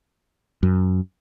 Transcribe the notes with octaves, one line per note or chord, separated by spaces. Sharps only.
F#2